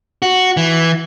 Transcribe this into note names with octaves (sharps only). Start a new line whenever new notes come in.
F#4
E3